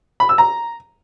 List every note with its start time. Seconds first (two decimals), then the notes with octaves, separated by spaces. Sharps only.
0.20 B5
0.29 E6
0.38 A#5